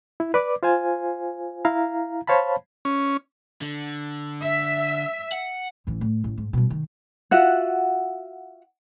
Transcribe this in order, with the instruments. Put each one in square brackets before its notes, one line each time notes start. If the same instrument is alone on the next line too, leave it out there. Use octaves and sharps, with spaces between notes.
[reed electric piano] E4
B4 D5 D6
F4 C5 F5 G#5
E4 F5 A#5
C5 C#5 F5 A5 B5
[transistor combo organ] C#4
[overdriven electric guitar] D3
[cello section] E5
[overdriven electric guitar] F#5
[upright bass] A1 E3
A2
A1
G#2
B2 G3
D#3
[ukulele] F4 F#4 E5 F#5